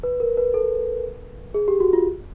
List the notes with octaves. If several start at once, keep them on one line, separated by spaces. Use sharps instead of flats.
B4
A#4
B4
A4
G#4
G4
F#4
F4